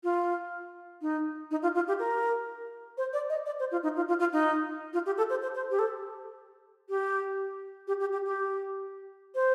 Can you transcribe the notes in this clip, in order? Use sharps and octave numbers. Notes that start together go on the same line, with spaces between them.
F4
D#4
D#4
F4
F4
G4
A#4
C5
D5
D#5
D5
C5
F4
D#4
F4
F4
F4
D#4
F4
G4
A4
C5
C5
C5
G4
A4
G4
G4
G4
G4
G4
C5